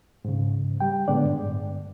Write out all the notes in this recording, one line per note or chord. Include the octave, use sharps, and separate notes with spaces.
G#2 C#3
G3 G5
A2 D3 G#3 B3 D4 D5
G2